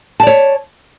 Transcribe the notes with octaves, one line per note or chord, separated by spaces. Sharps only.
C#5 D5 A5